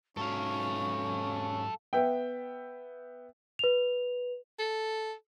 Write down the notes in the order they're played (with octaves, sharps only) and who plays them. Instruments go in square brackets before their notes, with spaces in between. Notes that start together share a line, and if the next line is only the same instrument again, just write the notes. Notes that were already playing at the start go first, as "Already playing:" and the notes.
[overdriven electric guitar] G#2 F#3 [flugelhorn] C#4 [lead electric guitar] A4 F5 [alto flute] C#6
[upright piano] B3 E5 G5
[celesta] B4 F7
[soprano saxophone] A4